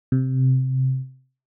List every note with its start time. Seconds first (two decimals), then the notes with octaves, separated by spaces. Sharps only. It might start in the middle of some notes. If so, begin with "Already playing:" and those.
0.12 C3